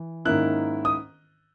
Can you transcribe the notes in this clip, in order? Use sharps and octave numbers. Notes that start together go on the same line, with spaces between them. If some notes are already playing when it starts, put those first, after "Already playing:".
Already playing: E3
G#2 D#3 A#3 C#4 E4 F#6
D#6